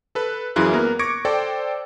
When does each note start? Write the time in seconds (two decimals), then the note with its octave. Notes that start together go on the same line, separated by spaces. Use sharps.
0.15 A4 B4
0.56 F#2 E3 E4 F4 G#4 F#6
0.72 A#3 B3 A#4 A#5
0.99 C#6 D6 G#6 A#6 C#7 D7
1.25 A4 C5 D5 G5